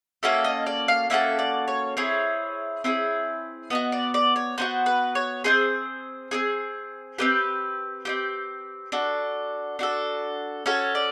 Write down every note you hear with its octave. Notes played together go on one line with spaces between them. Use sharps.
A#3 C#4 F#4 A4 E5
D#5
D5
F5
A#3 C#4 F#4 A4 E5
D5
C#5
C4 E4 G#4 C#5
C4 E4 G#4
B3 D#4 F#4 D#5
D5
D5
C#5
B3 D#4 F#4 C5
B4
C#5
C4 D#4 G#4 C5
C4 D#4 G#4
C4 D#4 G4 B4
C4 D#4 G4
D4 F#4 A4
D4 F#4 A4
C#4 F#4 A4 C#5
D5